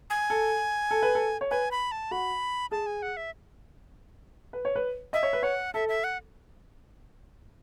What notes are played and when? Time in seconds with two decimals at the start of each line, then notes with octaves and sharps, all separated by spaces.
0.10 G#5
0.30 A4
0.91 A4
1.02 B4
1.15 A4
1.41 C#5
1.51 B4 G#5
1.71 B5
1.92 A5
2.11 F#4 B5
2.71 G#4 A5
2.86 G#5
3.02 F#5
3.17 E5
4.53 B4
4.65 C#5
4.76 B4
5.13 D#5 E5
5.23 C#5
5.33 B4
5.43 C#5 F#5
5.74 A4 E5
5.89 E5
6.04 F#5